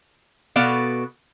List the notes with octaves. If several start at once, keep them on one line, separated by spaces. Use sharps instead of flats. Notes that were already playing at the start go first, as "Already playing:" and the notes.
B2 B3 F#4 A4 D5 F5